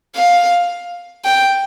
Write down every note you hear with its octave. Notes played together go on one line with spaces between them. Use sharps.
F5
G5